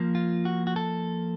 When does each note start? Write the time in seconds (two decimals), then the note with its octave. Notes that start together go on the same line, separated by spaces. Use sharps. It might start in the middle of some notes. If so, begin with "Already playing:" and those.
Already playing: F3 A#3
0.15 F4
0.45 F#4
0.67 F#4
0.76 A4